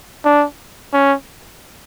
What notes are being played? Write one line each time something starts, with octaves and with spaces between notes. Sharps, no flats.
D4
C#4